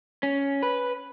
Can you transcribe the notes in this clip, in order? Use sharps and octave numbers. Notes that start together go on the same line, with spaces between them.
C#4
B4